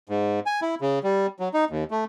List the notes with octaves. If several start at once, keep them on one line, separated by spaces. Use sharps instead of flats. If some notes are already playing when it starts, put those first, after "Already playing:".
G#2
G#5
E4
C#3
G3
F#3
D#4
D#2
A3